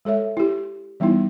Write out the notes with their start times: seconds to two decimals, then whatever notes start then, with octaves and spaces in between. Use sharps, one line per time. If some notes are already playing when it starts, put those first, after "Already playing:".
0.05 G#3 A4 C#5 E5
0.37 E4 G4
1.00 E3 G3 B3 D#4 E4